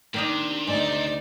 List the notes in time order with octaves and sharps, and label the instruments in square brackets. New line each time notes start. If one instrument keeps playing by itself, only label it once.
[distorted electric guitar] C3 [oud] D#3 D4 D#5 [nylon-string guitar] A#3
[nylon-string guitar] D2 G#2 [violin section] D#4 D5